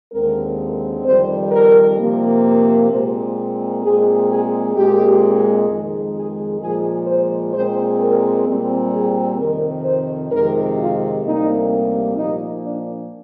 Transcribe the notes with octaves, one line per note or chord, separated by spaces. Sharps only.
D#2 D3 G#3 C4 A#4
F2 D#3 G3 C5
A#4
C3 F3 A#3
A#4
A#2 G#3 C4 C5
A#2 G#3 C4 G#4
G#4
A#2 G#3 C4 G4
F2 D#3 G#3
G#4
A#2 F3 G#3 G#4
C5
A#2 G#3 C4 C5
A#4
A#2 G3 C4
G#4
F2 C3 D#3 A#4
C5
F2 C3 D#3 G#3 A#4
F4
D2 C3 G3 A#3 D#4
A#2 F3 A#3 D#4
D4